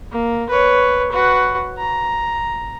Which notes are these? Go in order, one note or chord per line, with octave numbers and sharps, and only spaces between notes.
A#3
B4 C#5
F#4 B4
A#5